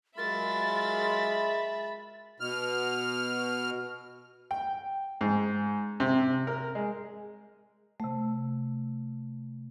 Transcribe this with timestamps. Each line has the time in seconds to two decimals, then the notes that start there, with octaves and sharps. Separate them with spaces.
0.18 F#3 G#3 F4 A#4 E5 B5 A6
2.40 B2 F6
4.51 G5
5.21 G#2
6.00 C3
6.47 A#4
6.75 G#3
8.00 C3 A3